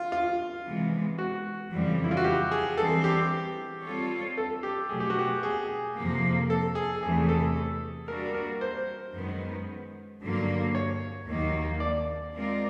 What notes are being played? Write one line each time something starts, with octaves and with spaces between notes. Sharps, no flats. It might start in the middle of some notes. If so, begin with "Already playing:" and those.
Already playing: F4
F4
C3 E3 G#3 B3
F#4
F2 C#3 E3 G3
E4
F4
F#4
G4
G#4
E3 G3 C4 A4
G4
G3 C4 F4 A4 C#5
A4
G4
B2 F#3 A3 G#4
G4
F#4
G4
G#4
F2 C3 F3 A#3
A4
G#4
E2 C3 E3 A3 G#4
A4
G3 A#3 D4 F#4 A#4
A#4
C5
F#2 D#3 G#3 B3
G2 D3 F#3 A#3
C#5
D#2 D#3 F#3 A#3
D5
G#3 C4 F4 A#4 D5